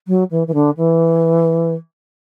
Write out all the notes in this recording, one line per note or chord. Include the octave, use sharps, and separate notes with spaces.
F#3
E3
E3
D3
E3